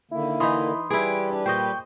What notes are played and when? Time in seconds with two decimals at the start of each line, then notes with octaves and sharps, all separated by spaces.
0.11 D3 D#3 A#3 E4
0.40 E3 D#4 B5 C6 D#6
0.90 G3 E4 G4 G#4 B4 D7
1.30 D4
1.46 A#2 C5 D#5 G5 C#6 G6